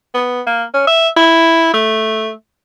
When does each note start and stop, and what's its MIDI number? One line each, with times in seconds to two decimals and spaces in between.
0.14 0.41 59
0.47 0.64 58
0.74 0.84 61
0.87 1.08 76
1.17 1.72 64
1.74 2.33 57